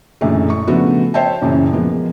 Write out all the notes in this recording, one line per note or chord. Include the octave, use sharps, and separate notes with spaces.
F#2 A#2 D3 E3 G#3 A3
C#6
C#3 F3 A3 B3 D4 F#4
C5 C#5 E5 G5 A5
F#2 A#2 C#3 E3
F3 G#3 A#3 B3